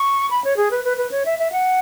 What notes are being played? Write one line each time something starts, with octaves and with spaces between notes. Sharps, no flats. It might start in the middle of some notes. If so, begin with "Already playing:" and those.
Already playing: C#6
B5
C#5
G#4
B4
B4
B4
C#5
E5
E5
F#5